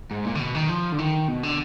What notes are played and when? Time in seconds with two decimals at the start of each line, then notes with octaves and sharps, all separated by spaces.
0.11 G#2
0.25 A#2
0.35 D3
0.39 B2
0.55 D#3
0.69 F3
0.92 D3
0.98 D#3
1.28 B2
1.43 D3